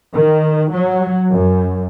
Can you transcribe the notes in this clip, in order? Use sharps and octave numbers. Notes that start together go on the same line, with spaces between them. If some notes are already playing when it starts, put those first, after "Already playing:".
D#3
F#3
F#2